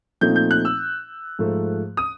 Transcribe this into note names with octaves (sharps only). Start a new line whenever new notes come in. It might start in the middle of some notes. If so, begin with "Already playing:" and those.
A#2 F3 A3 C4 D#4 G6
G6
F#6
E6
G#2 F3 A3
D#6